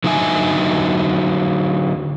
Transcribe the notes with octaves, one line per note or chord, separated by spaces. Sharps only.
D3 F#3 D4 D#4 E5 G#5